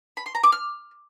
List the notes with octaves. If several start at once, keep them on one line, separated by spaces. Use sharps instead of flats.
B5
C6
A#5
D6
F6